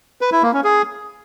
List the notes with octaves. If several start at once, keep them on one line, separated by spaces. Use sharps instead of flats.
B4
E4
A#3
C#4
G#4